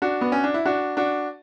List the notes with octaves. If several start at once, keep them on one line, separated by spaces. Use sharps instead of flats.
D4 F#4
B3
C#4
D4
E4
D4 F#4
D4 F#4